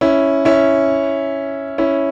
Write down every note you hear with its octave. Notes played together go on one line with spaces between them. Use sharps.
C#4 E4
C#4 E4
C#4 E4